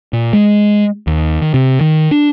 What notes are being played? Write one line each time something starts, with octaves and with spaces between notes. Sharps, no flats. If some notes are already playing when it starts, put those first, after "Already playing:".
A#2
G#3
D#2
D#3
C3
D#3
D4